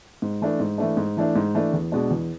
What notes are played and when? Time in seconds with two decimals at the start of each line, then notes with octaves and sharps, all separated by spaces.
0.22 G#2
0.42 E3 A3 D4
0.60 G#2
0.78 E3 A3 D4
0.97 G#2
1.17 E3 A3 D4
1.36 G#2
1.55 E3 A3 D4
1.73 E2
1.92 B2 G#3 D4
2.11 E2